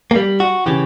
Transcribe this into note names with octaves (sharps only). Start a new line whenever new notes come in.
A#3
G3
F#4
C#3 E3 G4